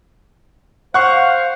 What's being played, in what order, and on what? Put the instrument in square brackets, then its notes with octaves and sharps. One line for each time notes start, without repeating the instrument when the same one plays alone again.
[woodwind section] C5 F5 [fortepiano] F#5 C#6